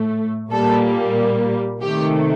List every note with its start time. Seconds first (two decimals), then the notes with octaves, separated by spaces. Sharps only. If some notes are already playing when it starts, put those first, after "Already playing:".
Already playing: A2 A3
0.51 A#2 G3 A#3 A4
1.81 C3 D#3 A3 G4